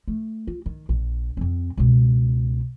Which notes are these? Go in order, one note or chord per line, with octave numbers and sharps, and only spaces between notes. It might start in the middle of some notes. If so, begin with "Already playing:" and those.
A3
F4
D#3
A#1
F2 C4
C#2 B2